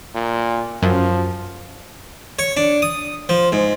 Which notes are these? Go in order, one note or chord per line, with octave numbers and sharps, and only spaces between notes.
A#2
F#2 F3
C#5
D4
D#6
F3
G#2